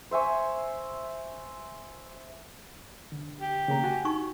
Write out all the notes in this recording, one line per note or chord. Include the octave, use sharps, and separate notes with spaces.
C5 E5 G#5 C#6
D3
G4
C#3 A#3 A#5
F#4 G#5
D#4 C#6